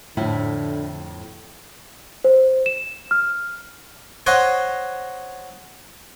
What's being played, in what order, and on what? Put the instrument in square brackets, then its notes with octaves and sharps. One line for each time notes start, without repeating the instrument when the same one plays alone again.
[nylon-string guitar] F2 A2 E4 [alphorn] D3
[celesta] C5
E7
F6
[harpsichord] C5 C#5 D#5 F#5